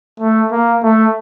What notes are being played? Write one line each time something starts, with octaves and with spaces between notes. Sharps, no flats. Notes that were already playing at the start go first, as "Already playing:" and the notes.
A3
A#3
A3